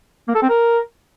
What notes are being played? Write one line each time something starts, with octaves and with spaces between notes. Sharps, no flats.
A#3
A4
C4
A#4